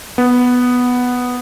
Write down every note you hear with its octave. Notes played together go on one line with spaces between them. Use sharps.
B3